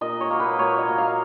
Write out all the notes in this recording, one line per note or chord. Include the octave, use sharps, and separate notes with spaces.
A#2 D#5
C#5
F#3 A#3
B4
A#2 C#5
D#5
F#3 A#3
F5